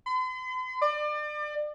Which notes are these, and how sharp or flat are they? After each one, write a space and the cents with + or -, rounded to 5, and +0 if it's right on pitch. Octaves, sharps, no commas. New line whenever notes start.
C6 -45
D5 +35